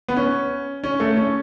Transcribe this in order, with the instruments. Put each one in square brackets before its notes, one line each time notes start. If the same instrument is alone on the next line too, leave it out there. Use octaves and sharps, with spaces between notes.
[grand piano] B3
C#4
C#4
A3
C#4